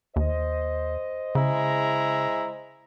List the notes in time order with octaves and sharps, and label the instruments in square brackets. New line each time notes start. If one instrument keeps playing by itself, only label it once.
[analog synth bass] D#2 [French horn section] C5 D#5
[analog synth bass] C#3 [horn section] G#3 E4 A#5